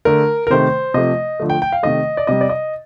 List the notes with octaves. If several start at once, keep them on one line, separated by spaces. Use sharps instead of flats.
D3 A3 A#4
A#4
C3 D#3 A3 C5
C3 F3 A3 D#5
D3 F3 A3
G5
G5
F5
C3 D#3 A3 D#5
D5
C3 G3 D#5
D5
D#5